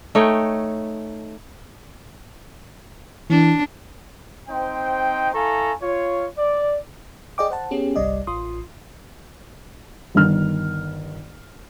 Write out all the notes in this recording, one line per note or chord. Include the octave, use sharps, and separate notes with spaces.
A3 D#4 C#5 G5
E3 D4
C4 D#4 C5 G5
E4 A4 F5 G#5 A#5 C#6
F4 C#5
D5
G#4 D5 D#5 G5 D6
C5 F#5 A5
B3 C#4 G4 G#4
G1 C2 G3 D5 D#5
A1 F4 C6 D#6
G1 D#3 F6